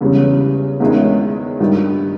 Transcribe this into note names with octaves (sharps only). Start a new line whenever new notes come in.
E2 C#3 E3 G3 C#4
E2 D#3 G#3 C#4 E4
G2 D#3 G3